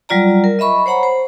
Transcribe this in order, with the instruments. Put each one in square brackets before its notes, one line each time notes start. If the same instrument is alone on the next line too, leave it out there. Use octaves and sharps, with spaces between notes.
[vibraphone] F#3 G3 F4 D5 A#5
A#4
D#5 E5 B5 C#6
C5 C#5 F#5 A#5 B5
C5